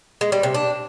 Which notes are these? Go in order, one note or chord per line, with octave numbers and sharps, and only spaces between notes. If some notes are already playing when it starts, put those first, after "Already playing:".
G#3
G3
C3
D4